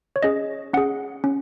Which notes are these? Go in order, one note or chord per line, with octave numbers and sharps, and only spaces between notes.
C#5
C#4 G#4 D#5
C#4 G#4 F#5
C#4